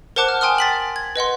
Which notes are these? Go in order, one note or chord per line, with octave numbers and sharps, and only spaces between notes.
A#4 C5 F#5 A5 D6 F#6
F6
G5 G#5 C6 D#6 F6
A6 B6 F#7
G#6
B4 D#5 F#5 C6